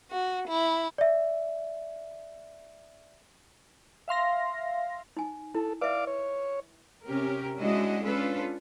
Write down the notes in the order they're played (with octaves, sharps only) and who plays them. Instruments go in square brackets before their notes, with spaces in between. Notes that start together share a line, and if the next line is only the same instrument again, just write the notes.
[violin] F#4
E4
[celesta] D5 E5
[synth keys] E5 F5 C6 A#6
[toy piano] D#4 G#5
[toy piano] E4 [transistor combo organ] A4
[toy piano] B4 E5 [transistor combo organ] D5 F5 D6
[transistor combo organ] C#5
[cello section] C3 C#4 G4 A#4
G#3 C#4 D4 E4 F#4 D#5
C#4 D4 F4 A4 B4